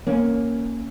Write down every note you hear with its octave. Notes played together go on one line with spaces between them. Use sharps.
A#3 C#4